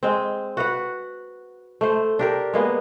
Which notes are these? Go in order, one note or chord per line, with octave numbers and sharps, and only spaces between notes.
G#3 C4
F#4 B4 F#5
A3 C5
D4 G4 A#4
G#3 A#3 B3